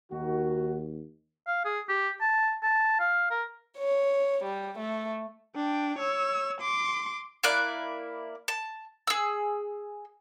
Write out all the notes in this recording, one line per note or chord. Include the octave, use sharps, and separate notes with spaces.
D#2 D#3 F#4
F5
G#4
G4
A5
A5
F5
A#4
C#5
G3
A3
D4 G5
C#5 E6
C6 D6
A#3 E4 D5 F#6
A5
G#4 E6